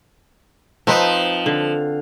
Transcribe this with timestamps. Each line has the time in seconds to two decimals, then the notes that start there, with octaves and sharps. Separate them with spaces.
0.87 F3 C4 D#4 B4
1.46 D3